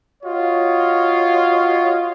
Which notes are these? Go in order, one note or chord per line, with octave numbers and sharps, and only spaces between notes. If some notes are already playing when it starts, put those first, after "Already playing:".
F4 F#4 C#5 D#5